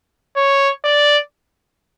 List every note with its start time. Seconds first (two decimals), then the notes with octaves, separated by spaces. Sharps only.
0.36 C#5
0.84 D5